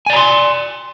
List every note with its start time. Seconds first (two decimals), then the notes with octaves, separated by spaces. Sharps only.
0.06 G#5
0.10 D5
0.13 A#5
0.16 C6